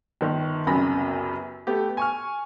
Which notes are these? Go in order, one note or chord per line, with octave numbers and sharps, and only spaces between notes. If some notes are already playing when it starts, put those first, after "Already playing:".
G1 D#3
C2 F#2 C#3 B3 B5 A#6
A3 B3 G4
G#5 C#6 F6